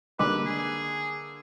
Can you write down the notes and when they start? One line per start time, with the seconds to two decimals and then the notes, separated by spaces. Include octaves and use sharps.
0.19 D3 D#3 G3 G#3 A#3 B4 D6
0.46 G#4